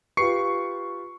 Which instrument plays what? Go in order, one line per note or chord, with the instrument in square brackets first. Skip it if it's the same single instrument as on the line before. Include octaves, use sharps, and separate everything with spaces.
[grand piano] F4 G4 B4 [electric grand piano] C#6 C7 C#7